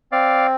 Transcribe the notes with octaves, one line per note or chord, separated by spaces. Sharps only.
C4 D5 F5